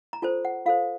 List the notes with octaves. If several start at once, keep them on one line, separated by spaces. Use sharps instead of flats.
A#5
F4 A4 C5 A5
F#5
F4 A4 C5 F5